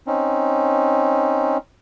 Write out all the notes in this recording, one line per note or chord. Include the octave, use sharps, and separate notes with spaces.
C4 C#4 D#4